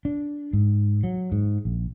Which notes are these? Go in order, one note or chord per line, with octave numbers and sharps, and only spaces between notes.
D4
G#2
F#3
G#2
A#1